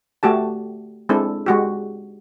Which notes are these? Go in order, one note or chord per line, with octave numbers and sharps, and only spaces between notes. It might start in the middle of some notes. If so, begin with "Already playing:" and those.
A3 F#4 G4 A5
G#3 C4 D4 E4 A4
G#3 F#4 G4